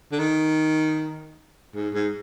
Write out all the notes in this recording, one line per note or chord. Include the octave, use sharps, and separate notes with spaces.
D3
D#3
G#2
G#2